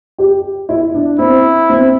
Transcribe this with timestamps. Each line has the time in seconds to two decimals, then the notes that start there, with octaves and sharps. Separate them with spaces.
0.18 G4
0.69 E4
0.94 D4
1.19 C4 E4
1.70 C4